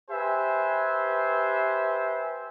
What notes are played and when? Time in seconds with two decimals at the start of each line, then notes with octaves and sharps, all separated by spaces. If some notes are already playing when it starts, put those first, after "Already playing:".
0.10 G4 B4 C5 E5 G#5